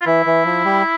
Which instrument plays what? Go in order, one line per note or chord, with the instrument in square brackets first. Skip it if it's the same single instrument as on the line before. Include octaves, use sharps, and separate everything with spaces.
[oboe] F4
[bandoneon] E3 [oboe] E4
[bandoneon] E3
F3
G3